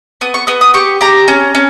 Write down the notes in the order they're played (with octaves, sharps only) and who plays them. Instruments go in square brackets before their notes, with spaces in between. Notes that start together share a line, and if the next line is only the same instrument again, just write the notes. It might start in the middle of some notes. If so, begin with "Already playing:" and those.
[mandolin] B3 D#6
C#6
B3 D#6
D#6
G4 C#6
G4 A#5
C#4
C#4